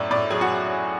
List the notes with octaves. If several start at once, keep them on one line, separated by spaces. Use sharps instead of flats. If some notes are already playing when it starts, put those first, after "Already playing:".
Already playing: F#2 A2 D5
A2 D5
F#3 G#4 G#5
F#4 F#5